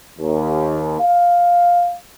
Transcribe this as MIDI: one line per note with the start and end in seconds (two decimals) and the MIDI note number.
0.19 0.96 39
1.00 1.95 77